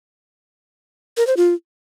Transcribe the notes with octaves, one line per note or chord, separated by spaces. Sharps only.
A#4
C5
F4